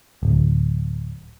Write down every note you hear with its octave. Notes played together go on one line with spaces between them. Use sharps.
D1